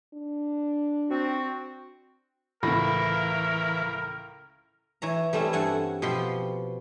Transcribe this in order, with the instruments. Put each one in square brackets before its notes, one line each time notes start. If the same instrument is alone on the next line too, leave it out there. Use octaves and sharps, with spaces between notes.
[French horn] D4
[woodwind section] C4 F#4
[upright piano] C#2 A2 [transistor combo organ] E3 [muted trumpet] A#4 [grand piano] B5 A#6
[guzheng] E3 C#5 A#5
G3 A3 C4 C#4 E4
G2 A4 F#5 G#5
B2 F3 B3 G4 B5 C6